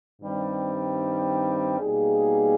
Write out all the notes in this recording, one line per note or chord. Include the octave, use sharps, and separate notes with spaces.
G2 D#3 G3 C4
B2 G3 A#3 D#4 G#4